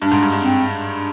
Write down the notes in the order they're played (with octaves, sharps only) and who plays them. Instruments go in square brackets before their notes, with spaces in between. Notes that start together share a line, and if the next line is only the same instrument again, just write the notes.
[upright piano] G2 [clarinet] D4
[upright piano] G#2
G2
G2
[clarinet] C4